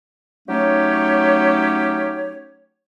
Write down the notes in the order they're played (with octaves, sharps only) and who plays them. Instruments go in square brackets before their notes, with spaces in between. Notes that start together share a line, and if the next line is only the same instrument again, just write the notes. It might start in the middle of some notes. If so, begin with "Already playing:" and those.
[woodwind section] F#3 A3 C#4 D#4 G4 C#5